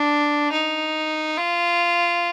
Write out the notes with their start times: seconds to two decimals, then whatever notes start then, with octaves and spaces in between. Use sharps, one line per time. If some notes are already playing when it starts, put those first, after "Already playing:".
Already playing: D4
0.52 D#4
1.38 F4